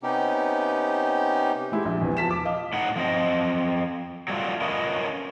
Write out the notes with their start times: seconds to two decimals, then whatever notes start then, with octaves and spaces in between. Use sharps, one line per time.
0.03 C3 B3 C#4 D#4 G4
1.72 G#3 E4 G4
1.85 A#1
2.01 E2 C3 E3
2.17 F3 A5 B6 E7
2.31 D6
2.45 D#5 F5
2.73 A2 D#4 F#5
2.96 F3 C4 D#5
4.28 F#3 G3 A3 F4
4.61 C#4 F4 A#4 B4 C#5 D#5